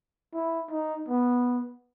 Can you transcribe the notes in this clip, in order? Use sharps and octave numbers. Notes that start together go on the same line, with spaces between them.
E4
D#4
B3